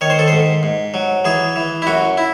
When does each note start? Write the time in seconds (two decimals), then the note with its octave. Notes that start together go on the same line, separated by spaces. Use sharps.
0.01 D#3 C#5
0.10 C5
0.19 A4
0.28 G#2 C5
0.63 G#2
0.94 F#3
1.25 E3 G#4
1.56 E3
1.82 E4
1.87 F#2 F#4
2.17 E4